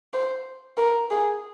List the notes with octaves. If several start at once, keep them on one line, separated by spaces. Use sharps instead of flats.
C5
A#4
G#4